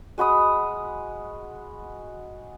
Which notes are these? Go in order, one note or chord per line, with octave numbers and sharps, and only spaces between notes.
G#3 F#4 B5 D#6